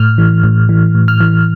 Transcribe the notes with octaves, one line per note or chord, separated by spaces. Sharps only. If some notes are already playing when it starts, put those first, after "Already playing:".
Already playing: A2 F6
E3
A2
E3
A2
F6
E3